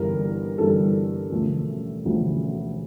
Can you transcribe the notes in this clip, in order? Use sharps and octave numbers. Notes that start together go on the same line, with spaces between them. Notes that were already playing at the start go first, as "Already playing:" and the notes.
Already playing: G1 G2 E3 G3 A#4
G1 G2 E3 G3 A4
E1 D2 C#3 F3 A3
E1 D2 C#3 F3 A3